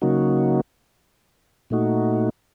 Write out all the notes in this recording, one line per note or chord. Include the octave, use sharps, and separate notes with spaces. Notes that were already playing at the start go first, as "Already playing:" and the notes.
C#3 F#3 A#3 D#4 F#4
A#2 A3 D#4 F#4